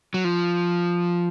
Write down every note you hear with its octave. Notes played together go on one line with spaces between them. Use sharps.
F#3
F3